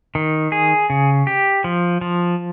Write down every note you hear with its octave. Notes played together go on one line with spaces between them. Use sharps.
D#3
G#4
C#3
G4
F3
F3